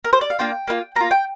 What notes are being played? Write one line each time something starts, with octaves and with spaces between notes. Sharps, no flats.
A#4
C5
D5
F5
A#3 D4 F4 G5
A#3 D4 F4
A#3 F4 A#5
G5